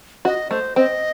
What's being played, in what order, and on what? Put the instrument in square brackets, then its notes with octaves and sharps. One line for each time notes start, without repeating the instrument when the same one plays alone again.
[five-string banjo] F#4 [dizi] D#5
[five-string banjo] A3 [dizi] C5
[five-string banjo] C4 [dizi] D#5